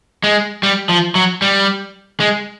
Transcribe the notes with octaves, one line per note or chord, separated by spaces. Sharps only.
G#3
G3
F3
F#3
G3
G#3